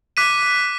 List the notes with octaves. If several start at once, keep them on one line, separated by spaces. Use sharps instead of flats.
D6 F#6 B6 D#7